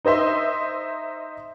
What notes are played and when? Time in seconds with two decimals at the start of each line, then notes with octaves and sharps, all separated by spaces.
0.05 D#4 C5 D#5 E5 C6